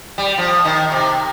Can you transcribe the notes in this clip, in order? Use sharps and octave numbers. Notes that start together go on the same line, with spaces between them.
G3
F3
D#3
C3